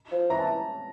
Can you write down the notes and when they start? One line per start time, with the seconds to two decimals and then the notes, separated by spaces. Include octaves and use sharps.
0.12 F3
0.30 E3 A#5
0.39 A5